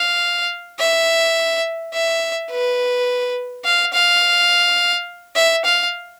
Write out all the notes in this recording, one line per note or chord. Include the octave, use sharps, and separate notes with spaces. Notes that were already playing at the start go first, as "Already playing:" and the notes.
Already playing: F5
E5
E5
B4
F5
F5
E5
F5